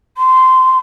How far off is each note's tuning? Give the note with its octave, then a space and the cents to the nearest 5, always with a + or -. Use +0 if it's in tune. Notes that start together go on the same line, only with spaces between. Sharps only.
C6 -15